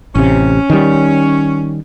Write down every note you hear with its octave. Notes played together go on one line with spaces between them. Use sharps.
A1 C3 C#4
D#3 G3